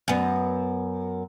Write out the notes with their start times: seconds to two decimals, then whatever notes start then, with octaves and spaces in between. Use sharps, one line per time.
0.08 F#2 B3